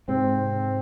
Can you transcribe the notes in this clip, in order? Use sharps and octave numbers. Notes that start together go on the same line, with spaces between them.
G#2 C3 C4